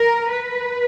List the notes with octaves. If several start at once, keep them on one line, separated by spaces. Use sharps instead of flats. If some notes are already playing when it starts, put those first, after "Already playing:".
Already playing: A#4
B4